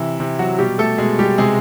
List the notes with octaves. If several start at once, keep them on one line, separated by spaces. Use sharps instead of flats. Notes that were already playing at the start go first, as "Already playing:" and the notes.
Already playing: C3 E3 E4
C3
F#3 F#4
B2 G3 G4
A3 A4
B2 G#3 G#4
G3 G4
C3 G#3 G#4